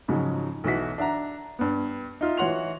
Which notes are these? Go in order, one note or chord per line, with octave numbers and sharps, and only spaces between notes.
G#2 C#3 F3 F#3
B1 E3 F#4 B6
D4 E5 F#5 A#5
G2 B3
D#4 F4 E5
E3 F#4 C#5 F#5 C6 F7